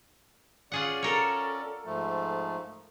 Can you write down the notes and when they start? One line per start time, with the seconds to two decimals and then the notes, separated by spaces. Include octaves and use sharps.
0.72 C#4 F4 G#4 D5 F#5
1.03 A4 A#4 C#5
1.85 G#2 F3 A3